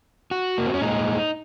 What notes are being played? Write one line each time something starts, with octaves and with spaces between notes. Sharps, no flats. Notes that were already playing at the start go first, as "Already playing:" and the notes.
F#4
A#3
C4
C#4
A#2 G#3 D#4